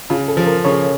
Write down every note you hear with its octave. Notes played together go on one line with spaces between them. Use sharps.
C#3 F4
A4
F3
A#4
C#3 C#5